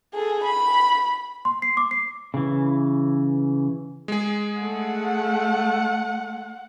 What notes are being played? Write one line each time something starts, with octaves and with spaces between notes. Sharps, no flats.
G#4 A4
B5
C6
C7
D6
C7
C#3 E3
G#3 G#4
A3 F#5